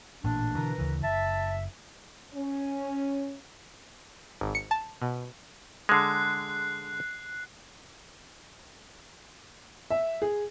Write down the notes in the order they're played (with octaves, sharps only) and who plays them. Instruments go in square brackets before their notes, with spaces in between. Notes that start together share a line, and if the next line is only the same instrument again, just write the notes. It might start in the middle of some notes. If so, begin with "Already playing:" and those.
[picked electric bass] A1 A#2 [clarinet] D4
[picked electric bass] B2 D3 E3 [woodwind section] A#4 B4 A#5
[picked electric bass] D2 C#3 E3
[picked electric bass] F#1 [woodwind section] E5 [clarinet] A5
[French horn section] C#4
[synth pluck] G#1
C#7
A5
B2
[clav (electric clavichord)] D3 G#3 [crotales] F#6 C7
[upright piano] E5
G#4